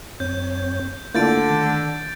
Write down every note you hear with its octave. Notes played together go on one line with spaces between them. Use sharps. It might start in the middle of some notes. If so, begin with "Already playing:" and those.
F#2 C4 C#5 G6
D3 A3 A#3 E4 F4 G6 A6 D7
D#3